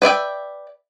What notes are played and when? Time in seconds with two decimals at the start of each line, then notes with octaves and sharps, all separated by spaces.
0.02 B4 D5 E5 G5